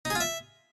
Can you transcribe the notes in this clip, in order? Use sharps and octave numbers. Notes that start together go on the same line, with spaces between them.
D#4
G#4
F4
E5